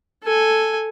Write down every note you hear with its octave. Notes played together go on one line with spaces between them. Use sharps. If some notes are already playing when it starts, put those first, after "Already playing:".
A4 G#5